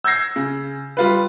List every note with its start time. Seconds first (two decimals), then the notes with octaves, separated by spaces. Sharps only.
0.04 E6 G6 G#6 A#6 C7
0.36 C#3
0.97 G3 F4 B4